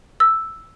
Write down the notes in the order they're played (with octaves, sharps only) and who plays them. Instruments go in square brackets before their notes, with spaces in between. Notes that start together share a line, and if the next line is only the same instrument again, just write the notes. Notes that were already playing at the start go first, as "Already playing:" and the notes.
[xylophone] E6